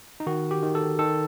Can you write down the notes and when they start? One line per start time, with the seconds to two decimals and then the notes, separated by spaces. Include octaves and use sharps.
0.20 D#4
0.27 D#3 F#4
0.51 G4
0.63 D#3
0.75 A4
0.99 D#3 A4